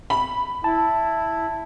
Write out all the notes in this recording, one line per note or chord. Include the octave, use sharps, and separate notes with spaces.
B5
E4 A5